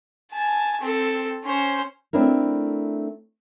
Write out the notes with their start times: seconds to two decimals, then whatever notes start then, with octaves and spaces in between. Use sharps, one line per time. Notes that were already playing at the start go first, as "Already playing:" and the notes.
0.32 G#5 A5
0.81 C4 A4
1.44 C#4 C5
2.13 A3 C4 D4 E4 A#4